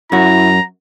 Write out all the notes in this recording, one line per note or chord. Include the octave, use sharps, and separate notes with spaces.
F#2 E4 F#4 A#5